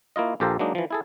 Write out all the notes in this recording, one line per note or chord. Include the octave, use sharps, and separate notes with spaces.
A#3 E4 F4 D#5
A#1 F3 G4 A4 A#4 C5
F#3 G#3 A#3 D4 D#4
E3 F3
E4 G#4 A4